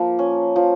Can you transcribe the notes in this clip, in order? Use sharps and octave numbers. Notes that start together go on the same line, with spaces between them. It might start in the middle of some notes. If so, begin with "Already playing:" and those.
Already playing: F3 A#3
C#4
F3